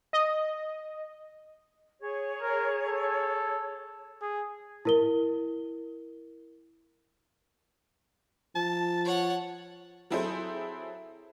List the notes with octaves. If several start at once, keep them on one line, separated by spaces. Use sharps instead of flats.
D#5
G#4 C#5
A#4
A4
G#4
E4 A#4 G7
F3 A5
C#5 F#5
F#3 C4 E4 G#4 A4 C5